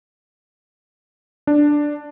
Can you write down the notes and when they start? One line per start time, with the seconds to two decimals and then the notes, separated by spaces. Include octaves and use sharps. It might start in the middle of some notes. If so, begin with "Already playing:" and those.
1.47 D4